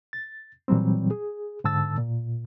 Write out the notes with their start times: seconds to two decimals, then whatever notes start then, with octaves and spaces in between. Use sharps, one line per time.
0.13 A6
0.68 A#2 E3 F#3 G3 C4
1.11 G#4
1.64 G#2 D3 A5 E6 A6
1.98 A#2